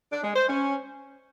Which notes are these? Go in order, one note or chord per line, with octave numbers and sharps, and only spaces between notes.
D4
G#3
C5
C#4